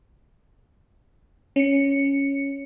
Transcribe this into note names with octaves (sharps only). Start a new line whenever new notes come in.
C#4 C#7